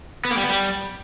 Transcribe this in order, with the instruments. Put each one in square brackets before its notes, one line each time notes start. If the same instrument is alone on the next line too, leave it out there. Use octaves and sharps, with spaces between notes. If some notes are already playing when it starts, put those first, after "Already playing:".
[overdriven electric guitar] B3
A#3
G3
B3
G3